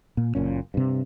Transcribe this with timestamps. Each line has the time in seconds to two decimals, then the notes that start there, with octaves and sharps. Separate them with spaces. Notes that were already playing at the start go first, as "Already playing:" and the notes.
0.17 A#2
0.35 F#1 A#2 C#4
0.74 G2 C3